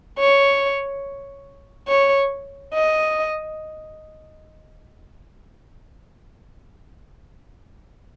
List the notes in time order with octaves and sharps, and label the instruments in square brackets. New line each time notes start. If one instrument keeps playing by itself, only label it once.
[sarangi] C#5
C#5
D#5